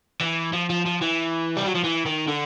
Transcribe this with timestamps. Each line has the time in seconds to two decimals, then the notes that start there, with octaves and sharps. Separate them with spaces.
0.21 E3
0.53 F3
0.70 F3
0.86 F3
1.02 E3
1.57 G3
1.66 F#3
1.75 F3
1.84 E3
2.05 D#3
2.27 D3